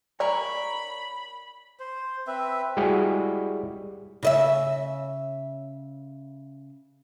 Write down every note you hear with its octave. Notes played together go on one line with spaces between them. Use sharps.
A#4 C#5 D5 G#5 B5
C5
C4 B4 E5
G3 G#3 E4 F#4 G#4 G5
C#3 D#5 E5